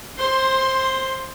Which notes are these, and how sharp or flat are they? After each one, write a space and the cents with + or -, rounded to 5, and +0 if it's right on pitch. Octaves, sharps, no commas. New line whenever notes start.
C5 +20 C6 +0